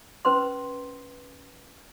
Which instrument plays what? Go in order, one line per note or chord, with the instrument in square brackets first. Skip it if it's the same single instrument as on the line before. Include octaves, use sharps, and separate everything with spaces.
[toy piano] C#4 B4 C5 C6